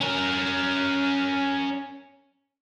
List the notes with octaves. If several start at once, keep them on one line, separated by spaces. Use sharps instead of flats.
C#4 A#4